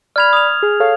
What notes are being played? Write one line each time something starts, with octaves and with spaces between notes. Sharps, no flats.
D5 B5 F6 G#6 F7
D#6 F7
G#4
A4 C#5 F5